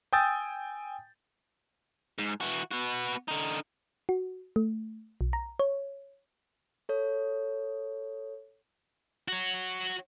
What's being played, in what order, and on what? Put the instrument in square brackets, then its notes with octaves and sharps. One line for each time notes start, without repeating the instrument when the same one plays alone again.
[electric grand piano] G5 G#5 D#6 E6 G6 A6
[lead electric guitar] G#2
E3 F#4
B3 F#4
D3 D#4
[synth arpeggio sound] F#4
A3
B1
A#5
C#5
[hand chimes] A4 C#5
[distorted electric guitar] F#4 C#5